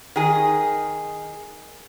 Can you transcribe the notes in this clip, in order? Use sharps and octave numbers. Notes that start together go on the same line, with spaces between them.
D#3 G#4